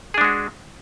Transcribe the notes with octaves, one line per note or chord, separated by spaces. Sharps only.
G#3 D4 F#4 G#4